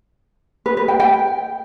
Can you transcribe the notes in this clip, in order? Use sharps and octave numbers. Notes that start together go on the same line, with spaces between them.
B4
B4
G5
G5